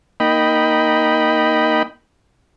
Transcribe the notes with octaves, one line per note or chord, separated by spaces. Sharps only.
A#3 D#4 D#5 G5 B5